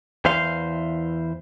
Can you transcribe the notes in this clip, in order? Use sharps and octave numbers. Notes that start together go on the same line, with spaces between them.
E2 E3 C5 F5 C6